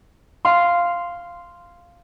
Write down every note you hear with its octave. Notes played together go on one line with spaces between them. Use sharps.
F5 C6